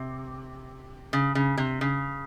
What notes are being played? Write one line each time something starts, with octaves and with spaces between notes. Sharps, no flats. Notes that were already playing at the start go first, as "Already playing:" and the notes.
Already playing: C3
C#3
C#3
C3
C#3